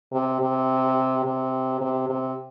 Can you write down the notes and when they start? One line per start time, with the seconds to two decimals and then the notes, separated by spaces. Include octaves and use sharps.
0.13 C3
0.41 C3
1.25 C3
1.81 C3
2.09 C3